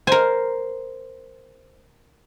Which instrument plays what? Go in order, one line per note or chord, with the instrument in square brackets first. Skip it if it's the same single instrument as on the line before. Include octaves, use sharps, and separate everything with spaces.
[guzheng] A#4 G#5 [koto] C5